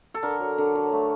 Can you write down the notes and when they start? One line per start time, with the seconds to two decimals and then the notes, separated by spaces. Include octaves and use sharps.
0.14 A4
0.23 D3 A#4
0.40 F#3
0.58 D3
0.75 F#3
0.92 A3